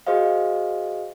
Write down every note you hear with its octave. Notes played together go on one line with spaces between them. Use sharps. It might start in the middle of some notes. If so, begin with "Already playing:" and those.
F#4 G#4 C5 D#5 F5